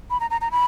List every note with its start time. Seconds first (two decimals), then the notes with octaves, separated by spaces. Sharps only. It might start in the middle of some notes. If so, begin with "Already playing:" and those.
0.10 B5
0.20 A#5
0.31 A#5
0.41 A#5
0.52 B5